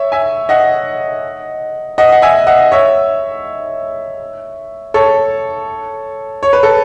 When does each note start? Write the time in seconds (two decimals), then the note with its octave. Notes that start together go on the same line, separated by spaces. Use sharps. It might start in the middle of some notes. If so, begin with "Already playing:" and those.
Already playing: C#5 E5
0.12 E5 G#5
0.49 D#5 F#5
1.98 D#5 F#5
2.12 F#5
2.22 E5 G#5
2.47 D#5 F#5
2.72 C#5 E5
4.94 A4 C#5
6.43 C#5
6.53 B4
6.63 A4